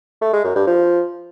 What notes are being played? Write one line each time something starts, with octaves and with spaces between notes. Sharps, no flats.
A3
G#3
F#2
G2
F3